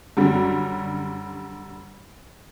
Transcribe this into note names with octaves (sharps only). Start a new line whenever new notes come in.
F#2 D3 G3 C#4